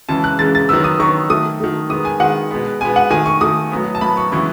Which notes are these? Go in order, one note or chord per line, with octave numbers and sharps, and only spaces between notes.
C#3 E3 G#3 A5
F#6
C#3 E3 G#3 A6
A6
D#3 F#3 B3 E6
D#6
D#3 F#3 B3 C#6
D#3 A3 D#6
D#3 A3
D#3 G#3 B3 D#6
G#5
D#3 G#3 B3 F#5
B2 G#3 B3
B2 G#3 B3 G#5
F#5
D#3 A3 G#5
C#6
D#3 A3 D#6
A2 F#3 B3
A5
A2 F#3 B3 B5
C#6
C#3 E3 G#3 B3 C#6